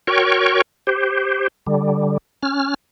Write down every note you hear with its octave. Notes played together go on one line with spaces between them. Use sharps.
F#4 A#4 C#5 G5 C#6
G4 C5
D3 G3
C#4 F6